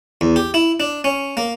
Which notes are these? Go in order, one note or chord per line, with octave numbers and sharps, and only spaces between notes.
E2
G4
E4
D4
C#4
A#3